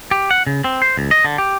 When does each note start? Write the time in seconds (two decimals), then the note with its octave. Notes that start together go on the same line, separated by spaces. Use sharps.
0.11 G4
0.31 F#5
0.47 C#3
0.64 C4
0.82 C5
0.97 C#2
1.11 D#5
1.25 D3
1.38 G4